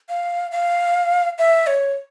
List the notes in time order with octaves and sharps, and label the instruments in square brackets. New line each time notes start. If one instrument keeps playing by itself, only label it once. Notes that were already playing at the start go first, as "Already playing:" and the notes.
[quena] F5
F5
E5
C#5